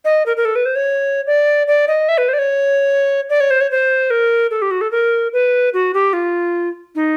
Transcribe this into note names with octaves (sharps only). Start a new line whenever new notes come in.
D#5
A#4
A#4
A4
B4
C5
C#5
D5
D5
D#5
E5
B4
C5
D5
C#5
D5
C#5
C5
C#5
C5
A#4
A4
G4
F#4
A4
A#4
B4
F#4
G4
F4
D#4